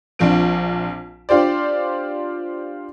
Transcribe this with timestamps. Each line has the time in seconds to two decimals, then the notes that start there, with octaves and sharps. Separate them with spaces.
0.19 A#1 F3 C4 D4 D7
1.29 D4 F4 G4 C5 D5